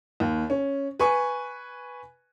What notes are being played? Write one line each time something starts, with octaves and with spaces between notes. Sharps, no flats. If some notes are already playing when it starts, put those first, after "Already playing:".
D#2
C#4
B4 G#5 C#6